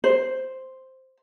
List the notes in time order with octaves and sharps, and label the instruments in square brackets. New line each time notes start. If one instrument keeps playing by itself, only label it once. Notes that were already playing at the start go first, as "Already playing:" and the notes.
[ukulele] C5